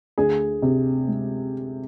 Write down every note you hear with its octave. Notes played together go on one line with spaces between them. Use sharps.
D2 G#4
C3
G#3